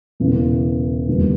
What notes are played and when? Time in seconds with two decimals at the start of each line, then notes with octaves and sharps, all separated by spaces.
0.20 E1 E2 C#3 E3
1.08 F1 D#2 D3 G3 B3